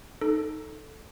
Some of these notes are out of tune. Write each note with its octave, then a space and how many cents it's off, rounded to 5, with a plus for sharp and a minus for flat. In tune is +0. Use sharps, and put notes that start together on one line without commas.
D#4 +0 A4 +0